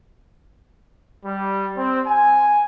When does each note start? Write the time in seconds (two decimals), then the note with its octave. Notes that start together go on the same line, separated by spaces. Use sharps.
1.26 G3
1.77 C4
2.07 G#5